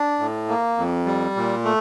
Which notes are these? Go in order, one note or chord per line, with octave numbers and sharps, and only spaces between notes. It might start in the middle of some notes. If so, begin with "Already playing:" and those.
Already playing: D4
A2
A#3
F2
G3
A#2
A3